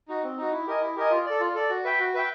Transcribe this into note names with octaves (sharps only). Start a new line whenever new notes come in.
D#4 F#4
C4
D#4 F#4
E4
G4 A#4 D#5 G#5
E4
G4 A#4 D#5 G#5
F4
A4 D5
F4
A4 D5
F#4
B4 E5 G5
F#4
B4 E5 G5